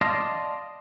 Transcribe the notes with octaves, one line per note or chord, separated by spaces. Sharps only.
D5 D#5 F5 A5 C6